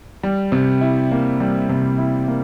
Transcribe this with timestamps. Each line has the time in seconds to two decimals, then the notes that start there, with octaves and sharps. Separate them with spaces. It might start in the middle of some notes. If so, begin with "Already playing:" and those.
0.23 G3
0.52 C3
0.81 E4
1.12 A#3
1.40 G3
1.69 C3
1.98 E4
2.28 A#3